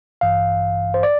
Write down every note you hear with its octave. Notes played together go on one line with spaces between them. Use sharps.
A1 G2 E3 F5
C5
D5